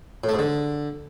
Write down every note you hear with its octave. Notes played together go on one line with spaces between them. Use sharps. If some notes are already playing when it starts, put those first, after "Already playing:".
A2
A3
G#2
D3